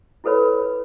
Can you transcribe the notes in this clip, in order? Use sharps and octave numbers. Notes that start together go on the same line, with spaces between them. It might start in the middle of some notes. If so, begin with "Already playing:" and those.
E4 F#4 A4 B4 C#5 B5